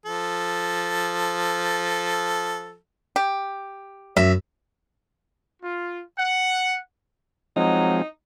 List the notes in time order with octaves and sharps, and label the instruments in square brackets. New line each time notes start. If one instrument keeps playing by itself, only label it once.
[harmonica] F3 A4
[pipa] G4
[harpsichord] F#2 [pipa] E5
[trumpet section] F4
F#5
[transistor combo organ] F3 G#3 C4 [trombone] F#3 [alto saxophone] D#4